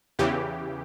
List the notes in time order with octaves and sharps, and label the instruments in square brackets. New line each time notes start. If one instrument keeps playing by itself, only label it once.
[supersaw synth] E2 C#3 E3 G4